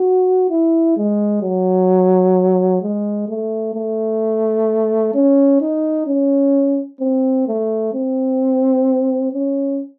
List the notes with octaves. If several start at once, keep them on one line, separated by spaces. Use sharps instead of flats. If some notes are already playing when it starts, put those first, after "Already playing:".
Already playing: F#4
E4
G#3
F#3
G#3
A3
A3
C#4
D#4
C#4
C4
A3
C4
C#4